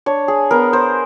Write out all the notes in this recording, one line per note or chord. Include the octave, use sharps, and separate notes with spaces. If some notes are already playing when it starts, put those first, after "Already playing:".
D4 C#5
G#4
B3 A#4
C5